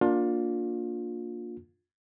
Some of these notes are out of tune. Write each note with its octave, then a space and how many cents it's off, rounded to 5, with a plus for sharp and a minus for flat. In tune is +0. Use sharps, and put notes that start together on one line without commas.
A#3 +0 D4 -5 F4 +25